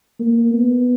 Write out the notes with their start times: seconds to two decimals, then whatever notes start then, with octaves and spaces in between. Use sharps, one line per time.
0.20 A#3
0.53 B3